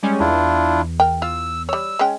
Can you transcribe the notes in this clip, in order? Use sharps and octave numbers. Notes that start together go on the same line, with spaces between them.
G3 G#3 C#4
E2 D4 E4 F4
A#4 G5
F4 E6
G3 C#5 E6
G#3 C#4 G5